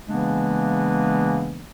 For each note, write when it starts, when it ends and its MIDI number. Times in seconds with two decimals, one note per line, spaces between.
0.08 1.69 49
0.08 1.69 52
0.08 1.69 56
0.08 1.69 58
0.08 1.69 59
0.08 1.69 62